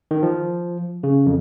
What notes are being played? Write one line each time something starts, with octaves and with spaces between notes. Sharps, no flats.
D#3
F3
C#3
F2